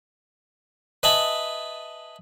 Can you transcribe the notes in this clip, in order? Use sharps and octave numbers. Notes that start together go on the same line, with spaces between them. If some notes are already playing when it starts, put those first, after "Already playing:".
B4 D#5 E5 G#5 A5 B5